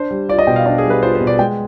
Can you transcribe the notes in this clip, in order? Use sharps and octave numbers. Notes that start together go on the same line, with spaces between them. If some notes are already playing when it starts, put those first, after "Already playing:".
Already playing: D4 C5
G3
F4 D5
D#5
B2 G5
F5
D4 D#5
G#4
G3
B4
F4 C5
C5
B2
D5
G#3 G5